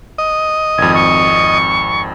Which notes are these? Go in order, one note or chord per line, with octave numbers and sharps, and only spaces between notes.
D#5
G#1 F2 G#6
C#6